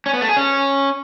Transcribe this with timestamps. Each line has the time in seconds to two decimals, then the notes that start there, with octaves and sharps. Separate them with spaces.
0.06 C#4
0.14 B3
0.21 A3
0.29 G#4
0.36 C#4